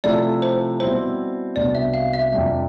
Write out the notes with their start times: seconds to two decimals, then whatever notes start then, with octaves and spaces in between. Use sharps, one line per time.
0.04 C3 F3 A3 E4 D5
0.42 C5
0.80 B2 G3 C4 E4 C5
1.56 C2 B2 B3 D4 D5
1.75 E5
1.94 F5
2.13 E5
2.32 F2 C3 G3 D4